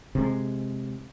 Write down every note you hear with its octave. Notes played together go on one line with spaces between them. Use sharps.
C3 G#3